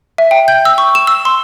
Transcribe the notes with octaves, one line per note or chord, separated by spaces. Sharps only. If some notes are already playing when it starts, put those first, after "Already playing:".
E5
G5
G6
E6
C#6
E7
E6
C6